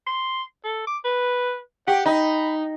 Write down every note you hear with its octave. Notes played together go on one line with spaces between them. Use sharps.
C6
A4
D6
B4
G4 F#5
D#4 B5